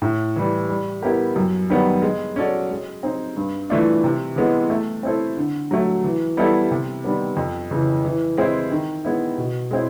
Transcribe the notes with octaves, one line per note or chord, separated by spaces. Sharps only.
A2
E3 G3
G3
B3 E4 G4 A#4
F#2
D#3 G3 B3
G#3
C#4 F#4 A4 D5
G#3
C4 D#4
G2
E3 A3 D4 F4
C3
E3 G#3 B3
A3
C4 E4 A4 C5
D3
F#3 A3
E3
G3 B3 E4 A4
C3
D#3 G3 B3
F2
C#3 E3
E3
G#3 C4 E4
D#3
G#3 B3 E4
B2
G#3 C4 E4